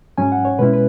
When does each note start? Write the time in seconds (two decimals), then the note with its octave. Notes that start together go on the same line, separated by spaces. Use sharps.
0.18 G#2 F#3 C#4 G#5
0.32 F#5
0.45 C#5
0.59 B2 G#3 C#4 E4 B4
0.73 B4